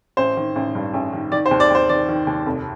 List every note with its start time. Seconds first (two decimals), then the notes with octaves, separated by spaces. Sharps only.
0.17 A1 C5
0.37 D#3
0.56 A1
0.75 G2
0.94 A1
1.13 D#3
1.32 D#3 D5
1.46 C5
1.51 D#2
1.60 D5
1.70 D#2 C5
1.89 D#3 D5
2.08 D#3
2.27 D#2
2.46 F1